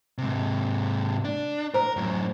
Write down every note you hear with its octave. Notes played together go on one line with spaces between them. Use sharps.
G#2 C3
D4
A#4 C5 A#5
F#2 A2